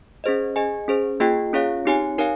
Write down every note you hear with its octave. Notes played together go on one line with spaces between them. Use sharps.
C#4 G#4 C5 D#5
G#4 D#5 G#5
C#4 G#4 C5
A#3 F4 G#4 D#5 G5
C#4 F4 G#4 C#5 F5
C4 D#4 G4 C#5 G#5
D#4 A#4 C#5 F5 G#5